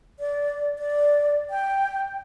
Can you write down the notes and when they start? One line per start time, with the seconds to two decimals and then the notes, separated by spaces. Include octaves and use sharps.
0.20 D5
0.79 D5
1.50 G5